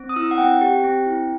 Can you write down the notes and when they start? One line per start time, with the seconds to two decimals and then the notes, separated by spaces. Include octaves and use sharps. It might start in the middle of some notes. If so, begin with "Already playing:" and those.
Already playing: C4
0.09 D#6
0.16 E4 E6
0.31 F#5
0.38 C4 G5
0.61 G4
0.84 C4
1.06 E4